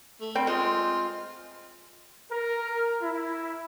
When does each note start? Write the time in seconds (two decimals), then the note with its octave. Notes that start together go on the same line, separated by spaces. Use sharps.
0.21 A3
0.35 G3 C4 G5
0.47 G#3 C4 F4
2.31 A#4
3.02 E4